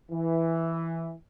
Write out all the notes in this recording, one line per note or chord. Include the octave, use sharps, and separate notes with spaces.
E3